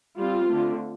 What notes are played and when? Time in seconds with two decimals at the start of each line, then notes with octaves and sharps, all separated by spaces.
0.17 G3 C4 F4
0.48 D3 A3 C4